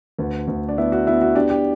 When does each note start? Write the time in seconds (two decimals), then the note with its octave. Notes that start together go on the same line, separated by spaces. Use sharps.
0.19 D2 B4
0.48 D2
0.68 D4
0.78 B3 E4
0.92 F#4
1.07 B3 E4
1.22 F#4
1.35 D4 G4
1.50 G4